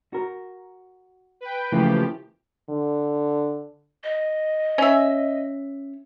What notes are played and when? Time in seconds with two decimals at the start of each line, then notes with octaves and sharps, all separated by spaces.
0.13 F#4 A#4
1.41 B4 G5
1.72 C#3 E3 F3 A3 A#3 G4
2.69 D3
4.03 D#5
4.78 C#4 E5